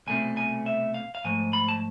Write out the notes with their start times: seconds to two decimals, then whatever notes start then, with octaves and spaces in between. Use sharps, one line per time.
0.07 C2 B2 A3 C4 G#5
0.37 G#5
0.66 E5
0.94 F5
1.15 F5
1.24 G#2 F3 A3 G#5
1.53 B5
1.68 A5